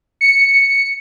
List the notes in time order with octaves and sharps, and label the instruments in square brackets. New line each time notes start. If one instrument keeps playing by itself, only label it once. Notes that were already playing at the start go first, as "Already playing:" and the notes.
[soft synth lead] C#7